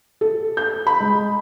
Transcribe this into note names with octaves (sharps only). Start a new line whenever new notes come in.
A4
G6
B5
G#3